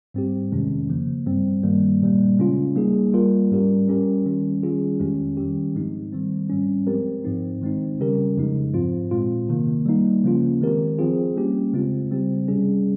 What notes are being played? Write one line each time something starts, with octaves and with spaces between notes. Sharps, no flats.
G#2 G3 C4 G4
F2 C3 D#3 G#3 C#4
C#3 F3 A#3
G2 G3 C4
G2 D#3 G3 A#3
A#2 G3 A#3
C#3 G#3 C#4 F4
G3 A#3 D#4 G#4
G3 A#3 F4 A#4
G#2 G3 C#4 G4 A#4
G3 C#4 G4 A#4
D#3 G3 C#4
D#3 G3 C#4 F4 G#4
F2 D#3 G#3 C#4 G4
D#3 G3 C#4 G4
G#2 F3 G#3 C4 D#4
D#3 G3 C4
G#2 G3 C#4
F3 G#3 C4 G4 A#4
G#2 F3 C4 D#4
D#3 G#3 C4 D#4
C#3 G3 C#4 G4 A#4
F2 C#3 F3 G#3 D#4
G#2 F3 C4 F4
A#2 G#3 C4 F4
C3 D#3 A#3
G3 A#3 D#4
C#3 F3 A#3 C#4 F4
D#3 G#3 C4 G4 A#4
F3 C4 F4 G#4
G3 A#3 C#4 G4
C#3 G#3 C4 F4
C#3 G3 C4 G4
C3 G3 C#4 G#4